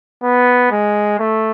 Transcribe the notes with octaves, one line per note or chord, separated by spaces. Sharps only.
B3
G#3
A3